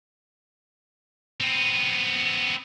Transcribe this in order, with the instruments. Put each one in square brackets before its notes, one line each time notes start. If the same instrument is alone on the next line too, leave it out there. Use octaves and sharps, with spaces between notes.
[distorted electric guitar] B3 C4